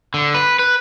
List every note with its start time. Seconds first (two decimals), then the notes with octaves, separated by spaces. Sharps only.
0.14 D3
0.34 B4
0.59 B4